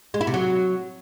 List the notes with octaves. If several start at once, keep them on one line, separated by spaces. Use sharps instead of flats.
G#3
E4
C3
F#3